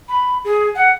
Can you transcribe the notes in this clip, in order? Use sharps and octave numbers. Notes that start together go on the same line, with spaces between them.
B5
G#4
F#5